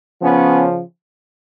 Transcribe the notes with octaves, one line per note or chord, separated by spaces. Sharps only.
C#3 F3 B3 C#4